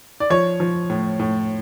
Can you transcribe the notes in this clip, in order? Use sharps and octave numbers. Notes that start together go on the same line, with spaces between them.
D5
F3 C#5
F3
A2
A2